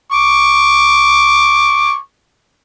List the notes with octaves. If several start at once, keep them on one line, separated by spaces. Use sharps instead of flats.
C#6 D6